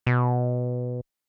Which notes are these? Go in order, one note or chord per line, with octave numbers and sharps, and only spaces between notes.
B2